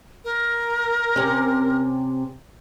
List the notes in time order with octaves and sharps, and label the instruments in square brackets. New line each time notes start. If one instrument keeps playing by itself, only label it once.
[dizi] A#4
[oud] C3 C#4